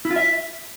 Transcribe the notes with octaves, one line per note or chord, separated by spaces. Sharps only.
E4
F4
E5